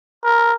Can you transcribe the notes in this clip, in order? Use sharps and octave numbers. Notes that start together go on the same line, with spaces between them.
A#4